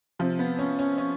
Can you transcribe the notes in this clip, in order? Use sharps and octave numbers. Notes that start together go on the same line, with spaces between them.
C3 F3
B3
C#4
C#4
C#4